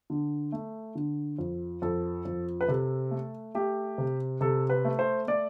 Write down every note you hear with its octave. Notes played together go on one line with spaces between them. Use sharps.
D3
A3
D3
F2
F2 A4
F2
B4
C3 A4
A3
A3 G4
C3
C3 A4
B4
A3
C5
A3 D5